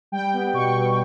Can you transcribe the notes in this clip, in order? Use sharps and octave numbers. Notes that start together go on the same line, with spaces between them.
G3 G5
B3
B2 C#6
B2